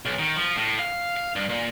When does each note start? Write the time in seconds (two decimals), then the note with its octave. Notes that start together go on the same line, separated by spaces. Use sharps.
0.05 B1
0.19 D#3
0.36 F3
0.56 A2
0.79 F5
1.17 F5
1.36 G2
1.49 A#2